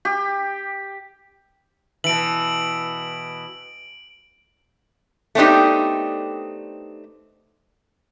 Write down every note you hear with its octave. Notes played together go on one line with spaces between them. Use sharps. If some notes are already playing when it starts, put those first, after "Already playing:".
G4
B2 E3 D7 F#7
A3 B3 C4 D4 D#4 G4